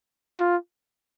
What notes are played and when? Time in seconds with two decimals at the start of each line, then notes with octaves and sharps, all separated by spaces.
0.40 F4